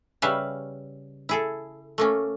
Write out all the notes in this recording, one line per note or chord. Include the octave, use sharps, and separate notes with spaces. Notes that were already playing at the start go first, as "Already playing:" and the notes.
C#3 G3 C#4 B4 E5 F5
E4 G#4 A4
A3 A#3 C#4